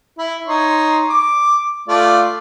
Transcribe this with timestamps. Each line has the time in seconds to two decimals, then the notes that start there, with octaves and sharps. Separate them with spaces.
0.18 E4
0.47 D#4 C#5 C6
1.10 D6
1.88 A3 F4 D5